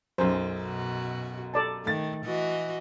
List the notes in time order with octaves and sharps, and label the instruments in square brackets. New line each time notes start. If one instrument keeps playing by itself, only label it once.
[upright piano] B1 F#2 [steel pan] C5
[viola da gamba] B2 F#4
[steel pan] A4 D5 A5
[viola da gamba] D#3 [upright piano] A3 A6
[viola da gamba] E3 F#4 D#5